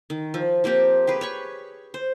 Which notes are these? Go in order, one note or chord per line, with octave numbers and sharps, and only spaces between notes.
D#3
F3
F3 A#3 C4 G4
G4 G#4 B4
C#5 B5 C#6
C5